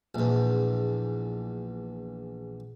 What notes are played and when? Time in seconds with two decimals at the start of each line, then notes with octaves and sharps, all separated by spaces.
0.15 A#1 E2